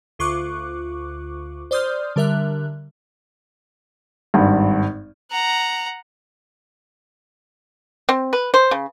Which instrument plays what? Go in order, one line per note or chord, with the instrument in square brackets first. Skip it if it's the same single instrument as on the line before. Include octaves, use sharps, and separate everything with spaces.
[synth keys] D2 F4 C#6 D6 F#6
C5 D5 C6 D#6 F6 G6
D3 G3 A#4 E5 F#6
[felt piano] G#1 G2
[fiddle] F#5 A#5
[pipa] C4
B4
C5
C#3